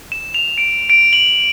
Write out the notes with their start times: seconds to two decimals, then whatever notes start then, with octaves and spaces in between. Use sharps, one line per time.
0.12 E7
0.34 F7
0.58 D7
0.90 D7
1.13 F#7